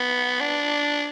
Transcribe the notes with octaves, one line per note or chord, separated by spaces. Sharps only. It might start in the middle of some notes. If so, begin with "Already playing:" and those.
Already playing: B3
D4